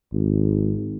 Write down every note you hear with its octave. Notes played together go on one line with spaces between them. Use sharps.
G#1